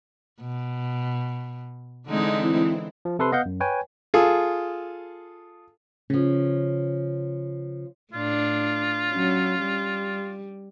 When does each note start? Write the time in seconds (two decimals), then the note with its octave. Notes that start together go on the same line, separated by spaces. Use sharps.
0.41 B2
2.07 D3 E3 G#3 C4 D#4 E4
3.05 F3
3.19 C3 A4 B4 C6
3.32 B3 D#5 F5 F#5 G6
3.46 F#2
3.60 B4 C#5 G5 G#5
4.14 F4 G#4 A4
6.10 C#3 F3 C#4
8.13 A2 D4 F4
9.09 F#3 C#4
9.62 G3